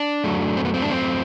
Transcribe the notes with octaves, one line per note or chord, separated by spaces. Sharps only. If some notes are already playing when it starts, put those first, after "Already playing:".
Already playing: D4
F#2 F#3 A3
C4
B3
C4
D4
C4